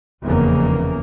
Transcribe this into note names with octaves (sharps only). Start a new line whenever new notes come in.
F1 E2 C#3 A#3